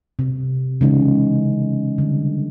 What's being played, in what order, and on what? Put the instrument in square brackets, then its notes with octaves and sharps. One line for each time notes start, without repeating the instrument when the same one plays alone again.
[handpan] C3
C#3 E3 G#3 D#4
D3 G3